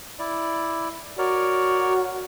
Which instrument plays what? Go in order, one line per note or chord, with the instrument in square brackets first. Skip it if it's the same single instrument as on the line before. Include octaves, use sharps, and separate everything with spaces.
[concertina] E4 D5
[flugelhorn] F#4 [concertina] A#4 C#5 D5